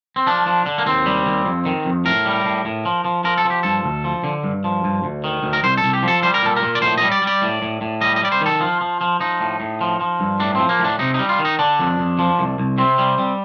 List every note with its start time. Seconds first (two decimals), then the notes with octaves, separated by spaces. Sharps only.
0.16 C4
0.26 F3 D4
0.46 F3
0.66 D3
0.78 A#3
0.86 D#2 C4
1.06 G3
1.26 D#2
1.46 F2
1.65 D#3
1.85 F2
2.05 A2 A#4
2.25 G3
2.45 A2
2.65 A2
2.85 F3
3.04 F3
3.24 F3 A#4
3.38 A4
3.45 F3
3.50 G4
3.63 G2 A4
3.84 D2
4.04 F3
4.24 D3
4.44 G2
4.64 F3
4.84 G2
5.04 D2
5.24 D#3
5.43 D2
5.53 A#4
5.63 C2 C5
5.77 A4
5.83 C2
5.93 G4
6.03 F3 A4
6.23 G3 C5
6.34 A#4
6.43 A#2 A4
6.56 A#4
6.63 A#2
6.75 D5
6.82 A2 C5
6.98 G3 D#5
7.11 D5
7.22 G3
7.27 D5
7.42 A2
7.62 A2
7.81 A2
8.01 G3 D#5
8.16 D#5
8.22 G3 D5
8.32 C5
8.41 D#3 A4
8.60 F3 F4
8.81 F3
9.01 F3
9.20 F3 D#4
9.40 A2
9.60 A2
9.81 F3
10.00 F3
10.20 G2
10.40 A2 D4
10.55 F3 C4
10.69 A#3
10.80 A2 D4
10.99 C3 D#4
11.14 D#4
11.19 G3
11.29 F4
11.39 D#3
11.45 D#4
11.59 D3 D4
11.79 F2
11.99 F2
12.19 F3
12.39 C2
12.58 C2
12.78 C3 C4
12.98 G3
13.18 G3